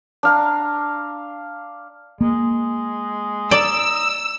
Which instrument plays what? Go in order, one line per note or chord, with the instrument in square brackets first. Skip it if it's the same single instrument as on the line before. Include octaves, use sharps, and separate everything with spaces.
[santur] D4 F5 A#5
[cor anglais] G#3 [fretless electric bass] A#3
[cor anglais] D#4 [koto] D5 [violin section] E6